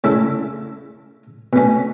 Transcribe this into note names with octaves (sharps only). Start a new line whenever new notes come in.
C#3 A3 E4 A4
B2 A3 C#4